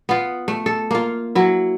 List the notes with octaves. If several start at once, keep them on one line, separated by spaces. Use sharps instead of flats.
B3 F4
A3
A4
A#3 F4
F#3 E4